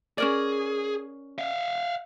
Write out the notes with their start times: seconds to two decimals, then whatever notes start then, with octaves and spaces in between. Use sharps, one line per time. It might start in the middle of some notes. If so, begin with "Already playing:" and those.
0.18 C#4 G#4 A#4 D5
1.38 E5 F5